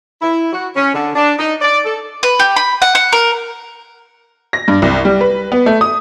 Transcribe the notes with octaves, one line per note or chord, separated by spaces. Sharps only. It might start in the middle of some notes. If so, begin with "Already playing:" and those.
E4
F#4
C#4
D3
D4
D#4
D5
A4
B4
G4
B5
F#5
F#5
A#4
A#6
G2
C2
G3
B4
B3
A3
D#6